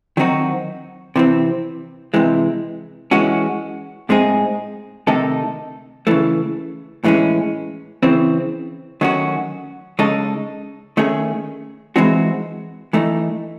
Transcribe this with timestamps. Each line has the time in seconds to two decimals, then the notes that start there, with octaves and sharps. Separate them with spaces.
0.17 D#3 F#3 C4 D#4 F#4
1.16 C3 E3 C4
2.14 C3 E3 G#3
3.11 E3 G#3 C#4 F#4
4.09 A2 G#3 C4 D#4 G#4
5.07 C3 D#3 A3 D#4 A4
6.07 C#3 E3 A3
7.04 A2 E3 G#3 C#4
8.03 C#3 E3 C4
9.01 D#3 F#3 A3 C#4 F#4
9.99 C#3 G#3 D#4 A4
10.97 D#3 A3 C#4 G#4
11.96 E3 G#3 C4 D#4 F#4
12.93 E3 A3 D#4